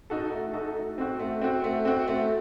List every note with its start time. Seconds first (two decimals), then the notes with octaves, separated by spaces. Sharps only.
0.10 D#4 F#4 A4
0.31 A3
0.53 D#4 F#4 A4
0.76 A3
0.98 C4 F#4
1.19 A3
1.42 C4 F#4
1.64 A3
1.85 C4 F#4
2.07 A3